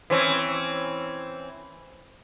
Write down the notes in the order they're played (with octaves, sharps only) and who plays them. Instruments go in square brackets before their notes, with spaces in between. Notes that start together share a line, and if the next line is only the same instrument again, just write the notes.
[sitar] E3 C4 C#4